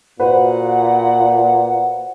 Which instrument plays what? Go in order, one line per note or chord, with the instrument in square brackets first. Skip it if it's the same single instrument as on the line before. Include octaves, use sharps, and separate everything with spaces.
[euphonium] A#2 [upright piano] F#4 B4 C5 [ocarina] F#5